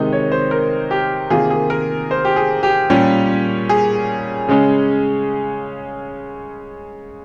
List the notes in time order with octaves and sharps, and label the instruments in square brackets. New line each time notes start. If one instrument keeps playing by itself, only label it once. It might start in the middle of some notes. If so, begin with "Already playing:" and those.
Already playing: [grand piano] C3 D#3 G#3 D#4
C#5
C5
A#4
G4
C3 D#3 A#3 F4 G#4
G#4
A#4
C5
G4
G#4
G4
A#2 G3 C#4
G#4
C#3 G#3 C#4